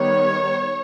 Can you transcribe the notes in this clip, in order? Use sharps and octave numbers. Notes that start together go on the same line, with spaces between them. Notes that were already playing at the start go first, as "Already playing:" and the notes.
Already playing: D#3 G3 B3 C#5